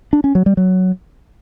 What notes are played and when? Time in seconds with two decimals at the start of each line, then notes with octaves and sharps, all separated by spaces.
0.13 D4
0.24 C#4
0.35 F#3
0.46 G3
0.57 F#3